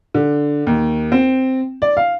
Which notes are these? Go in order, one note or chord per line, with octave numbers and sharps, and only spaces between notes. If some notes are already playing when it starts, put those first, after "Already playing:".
D3
D#2
C4
D5
F5